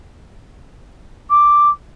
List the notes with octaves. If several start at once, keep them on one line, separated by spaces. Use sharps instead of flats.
D6